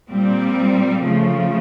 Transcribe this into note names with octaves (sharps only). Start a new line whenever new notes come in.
A#2 G3 C4
C#3 F3 A3